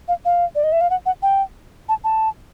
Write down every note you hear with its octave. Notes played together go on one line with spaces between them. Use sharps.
F5
F5
D5
D#5
E5
F5
F#5
F#5
G5
A5
A5